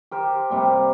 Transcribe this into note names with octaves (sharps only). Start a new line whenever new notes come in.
G4 A#4 C5
C3 G3 A#3